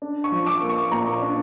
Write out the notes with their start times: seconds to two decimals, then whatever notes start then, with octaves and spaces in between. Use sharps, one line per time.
0.02 D4
0.24 C#6
0.32 F3
0.47 D6
0.62 A#3
0.69 C#6
0.92 A#2 A#5
1.22 D4